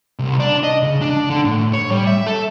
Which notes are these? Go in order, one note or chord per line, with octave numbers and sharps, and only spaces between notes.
C2
D4
D#5
C#3
D4
D3
A2
C#5
G3
E5
A4